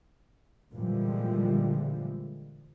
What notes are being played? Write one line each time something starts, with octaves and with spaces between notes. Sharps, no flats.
A#2 D3 E3 F3 G3 G#3